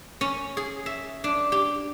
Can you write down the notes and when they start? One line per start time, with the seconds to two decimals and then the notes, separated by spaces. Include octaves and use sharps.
0.21 C#4
0.57 G#4
0.86 E5
1.24 D4
1.52 G4